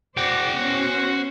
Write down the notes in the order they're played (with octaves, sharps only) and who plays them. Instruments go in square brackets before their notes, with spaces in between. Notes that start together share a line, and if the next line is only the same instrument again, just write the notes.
[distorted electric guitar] F#4 G5 [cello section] C5 D5
[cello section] B3 C#4 C5